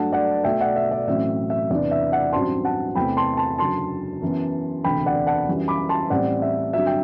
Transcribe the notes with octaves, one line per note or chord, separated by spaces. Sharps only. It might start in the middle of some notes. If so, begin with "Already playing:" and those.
Already playing: G2 F#3 A3 D4 F#5 A5
D5 F#5
B1 B2 A3 E5 G5
D5 F#5
E5
D5
A1 A2 F#3 C4 E5
E5
E2 C3 E3 B3 D4 D5
E5
D5 F#5
A1 G2 F#3 C4 A5 C6
F#5 A5
E2 C3 E3 A3 C4 G5 B5
A5 C6
A5 C6
F#1 F#2 D3 F#3 A5 C6
F#2 E3 B3
E1 D2 C3 G5 B5
D5 F#5
F#5 A5
F#2 E3 G3
B5 D6
A5 C6
A1 A2 G3 C4 D5 F#5
E5
G2 D3 F#3 C4 E5
G5